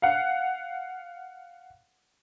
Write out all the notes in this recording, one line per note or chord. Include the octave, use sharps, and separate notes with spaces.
F5 F#5